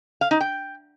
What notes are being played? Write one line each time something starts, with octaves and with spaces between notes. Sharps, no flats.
F5
D#4
G5